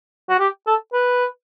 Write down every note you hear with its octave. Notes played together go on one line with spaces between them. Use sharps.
F#4
G4
A4
B4